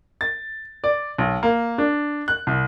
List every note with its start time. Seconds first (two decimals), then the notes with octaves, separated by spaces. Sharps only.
0.21 A6
0.84 D5
1.18 B1
1.43 A#3
1.78 D4
2.28 F#6
2.47 C2